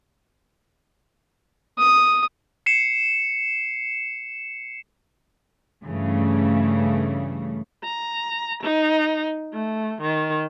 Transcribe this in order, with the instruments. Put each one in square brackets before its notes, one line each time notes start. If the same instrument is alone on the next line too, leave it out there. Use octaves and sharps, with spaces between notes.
[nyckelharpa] D#6
[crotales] C7 C#7 E7
[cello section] G2 C#3 E3 A3
[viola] A#5
D#4
A3
D#3